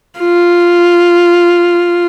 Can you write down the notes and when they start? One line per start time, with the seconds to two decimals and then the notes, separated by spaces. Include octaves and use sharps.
0.20 F4